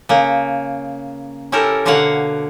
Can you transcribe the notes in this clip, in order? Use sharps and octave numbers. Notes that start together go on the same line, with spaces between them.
C#3 A#3
C#4 E4 G4 A4 A#4
B2 D3 A#3 C#5 F5 F#5